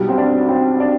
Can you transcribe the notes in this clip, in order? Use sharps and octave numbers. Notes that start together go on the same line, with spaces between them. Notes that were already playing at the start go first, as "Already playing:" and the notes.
Already playing: B1 B2 G3
C4
D4
C4
D4